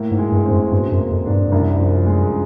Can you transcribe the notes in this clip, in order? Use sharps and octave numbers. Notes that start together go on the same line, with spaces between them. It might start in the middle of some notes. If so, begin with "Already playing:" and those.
Already playing: A2 A#3
G#2
G#3
G2
C4
F#2
G2 B2
F#2
A#3
F2
G#2 D4
G2
G2
C2 F#2
F3
G#3